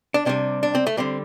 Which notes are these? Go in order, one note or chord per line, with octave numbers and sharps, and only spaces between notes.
D4
C3 G3 D4
D4
C4
A3
D3 G3 C4